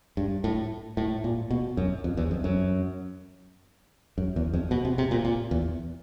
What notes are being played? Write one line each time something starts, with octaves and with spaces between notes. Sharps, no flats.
G2
A2
A2
A#2
B2
F#2
F2
E2
F2
F#2
F#2
E2
F2
B2
C3
C3
A#2
A#2
E2